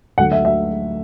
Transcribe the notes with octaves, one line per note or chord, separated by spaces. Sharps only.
D2 D3 F#3 A3 F#5
E5
E5